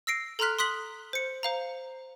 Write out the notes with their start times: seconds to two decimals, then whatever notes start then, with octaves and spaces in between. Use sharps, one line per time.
0.07 E6 A#6 C7 D7
0.39 A4 A#5 C6 F6 F#6 B6
0.59 C6 D#6 F#6 B6 F#7 G7
1.13 C5 C#7
1.43 C5 F5 A#5